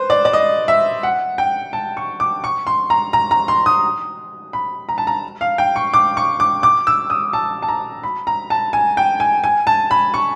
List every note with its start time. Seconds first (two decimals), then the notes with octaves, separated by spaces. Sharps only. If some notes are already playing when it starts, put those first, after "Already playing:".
Already playing: B4 C5
0.10 D5
0.25 D5
0.33 D#5
0.68 E5
1.03 F#5
1.38 G5
1.73 A5
1.97 C#6
2.20 D6
2.44 C#6
2.67 C6
2.90 A#5
3.13 A#5
3.31 A#5
3.48 C6
3.66 D#6
4.53 B5
4.89 A#5
4.98 A5
5.07 A#5
5.41 F5
5.58 G5
5.76 C#6
5.94 D6
6.17 C#6
6.40 D6
6.63 D6
6.87 E6
7.10 D#6
7.33 A5
7.62 A5
7.68 A#5
8.03 B5
8.27 A#5
8.50 A5
8.73 G#5
8.97 G5
9.20 G#5
9.44 G#5
9.67 A5
9.91 B5
10.14 C#6